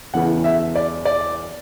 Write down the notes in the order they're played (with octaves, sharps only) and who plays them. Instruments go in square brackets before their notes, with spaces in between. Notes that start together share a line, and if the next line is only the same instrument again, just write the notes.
[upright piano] E1 E2 C#3 E3 F#5
E5
D5
D5